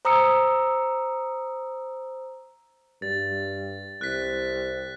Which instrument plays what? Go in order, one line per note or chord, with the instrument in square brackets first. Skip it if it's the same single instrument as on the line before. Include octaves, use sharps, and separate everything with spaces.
[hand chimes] C5 A#5 D#6 E6 C#7
[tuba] G2 [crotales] A6
[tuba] C2 [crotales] F#6 B6